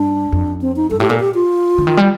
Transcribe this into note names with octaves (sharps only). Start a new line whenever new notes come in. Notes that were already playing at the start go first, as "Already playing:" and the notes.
Already playing: G2 D4
F2
C4
D#4
G2 A4
A2 G4
A#2 A4
G4
F4
D3
D#3
G3